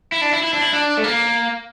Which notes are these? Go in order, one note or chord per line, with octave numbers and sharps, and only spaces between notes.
E4
D4
E4
E4
D4
E4
D4
A3
A#3